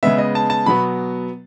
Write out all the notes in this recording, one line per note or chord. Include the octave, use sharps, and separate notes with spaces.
C#3 G#3 B3 E5
D#5
A5
A5
B2 F#3 B3 B5